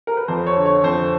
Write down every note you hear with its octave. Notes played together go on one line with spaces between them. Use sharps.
A#4
B4
F2 C5
C#5
D3
C#5
F2 C5